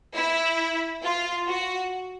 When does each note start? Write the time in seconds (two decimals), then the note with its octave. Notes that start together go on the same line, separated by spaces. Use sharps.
0.16 E4
1.03 F4
1.47 F#4